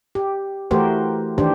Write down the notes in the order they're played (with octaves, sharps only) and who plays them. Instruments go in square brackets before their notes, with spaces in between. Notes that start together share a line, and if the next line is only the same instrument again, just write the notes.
[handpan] G4
E3 A3 F#4 G4 A#4 C5
D#3 E3 D4 G4 C5